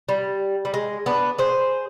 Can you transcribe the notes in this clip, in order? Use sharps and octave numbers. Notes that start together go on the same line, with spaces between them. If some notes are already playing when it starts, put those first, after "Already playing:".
G3
G3
G#3
B3 D4
G#4 C5